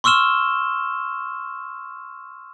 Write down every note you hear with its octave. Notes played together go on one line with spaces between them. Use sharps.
C6 C#6 E6 F6 E7 G7